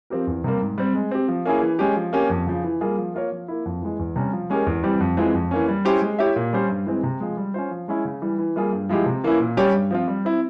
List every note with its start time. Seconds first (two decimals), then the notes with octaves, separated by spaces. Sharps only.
0.10 F3 C4 G4 A#4
0.27 E2
0.44 C3 G3 A#3
0.61 G#2
0.78 G3 C4
0.94 G#3
1.11 C4 G4
1.28 F3
1.45 A#3 C#4 E4 G#4
1.62 E3
1.79 G#3 C#4 G4
1.96 F3
2.13 A#3 C#4 G4
2.30 F2
2.47 C#3 F3
2.64 E3
2.81 G3 A#3 F4 G#4
2.98 F3
3.14 A#3 F4 A#4 C#5
3.32 F3
3.48 A#3 E4
3.66 F2
3.82 E3 G#3
3.99 E2
4.16 C3 G3 C#4
4.33 F3
4.50 G#3 C#4 G4 A#4
4.66 E2
4.83 E3 G3 C4 G4
5.00 F2
5.17 E3 G#3 C4 F4
5.34 F2
5.51 E3 A#3 C#4
5.68 G3
5.85 C#4 E4 G4 C5
6.02 G#3
6.19 E4 G4 C#5 E5
6.36 A#2
6.53 G3 C#4 G4 C5
6.69 G2
6.86 E3 G#3 C4
7.03 C3
7.20 F3 G#3
7.37 G3
7.54 C#4 F4 C5
7.71 F3
7.88 G#3 C#4 E4
8.05 C#3
8.22 E3 G3
8.39 E3
8.56 G3 A#3 F4 G#4
8.73 G2
8.89 F3 G#3 E4 G4
9.06 C3
9.24 E3 A#3 C#4 E4
9.40 A#2
9.57 G3 C#4 G4 C#5
9.74 G2
9.91 F3 C4 F4
10.08 G3
10.25 C4 E4